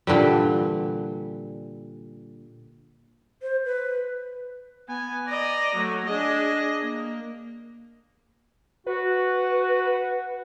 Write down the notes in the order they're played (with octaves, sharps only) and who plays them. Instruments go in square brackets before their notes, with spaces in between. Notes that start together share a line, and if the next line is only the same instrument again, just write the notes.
[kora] A#2 D3 E3 G3
[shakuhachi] C5
B4
[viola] B3 [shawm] G#5
[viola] D5 D#5 [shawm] A#5
[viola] F#3 A3
[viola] D4 G#4 [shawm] D#5
[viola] A#3
[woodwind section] F#4 [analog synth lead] B4